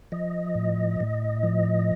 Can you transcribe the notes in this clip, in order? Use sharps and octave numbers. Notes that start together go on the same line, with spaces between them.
F3 D#5
A2
A2
F3